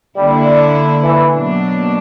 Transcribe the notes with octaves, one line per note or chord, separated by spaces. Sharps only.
D3 G3 A#3 E4
D4
E3
B2 F#3 A#3 D4